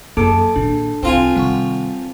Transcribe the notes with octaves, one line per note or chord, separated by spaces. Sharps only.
F#2 A#3 G#4 A4 D6 D7
A#2 D#3 D4
C2 C4 D#4 F4 G#5
C3 D#3 G3 F#5 C#6